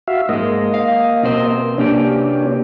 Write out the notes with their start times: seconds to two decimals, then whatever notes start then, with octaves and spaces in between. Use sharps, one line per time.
0.08 F#4 E5 F5
0.29 G#2 G#3 A#3 D#5
0.74 F5
1.23 B2 C4 C5
1.78 C3 A#3 C#4 D4 G4